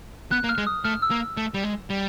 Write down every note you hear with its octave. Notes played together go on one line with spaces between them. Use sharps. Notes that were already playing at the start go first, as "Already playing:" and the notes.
B3 F#6
A#3
F6
G#3
D#6
A3 F6
E6
A#3
A3
G3
G#3
G3